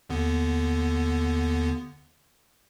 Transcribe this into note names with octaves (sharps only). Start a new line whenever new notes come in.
D#2 D3 B3